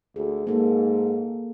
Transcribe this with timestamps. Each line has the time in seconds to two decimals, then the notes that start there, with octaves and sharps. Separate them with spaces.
0.16 D2 G#4
0.47 G#2 A#3 A4